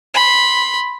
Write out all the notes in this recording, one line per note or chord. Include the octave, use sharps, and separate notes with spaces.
B5 C6